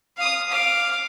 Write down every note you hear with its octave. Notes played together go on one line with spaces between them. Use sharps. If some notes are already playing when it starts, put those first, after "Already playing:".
F5 D#6
F5 D6